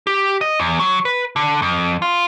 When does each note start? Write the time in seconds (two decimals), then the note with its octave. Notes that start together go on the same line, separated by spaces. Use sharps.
0.07 G4
0.41 D#5
0.60 E2
0.79 F#3
1.05 B4
1.36 D3
1.62 F2
2.02 F4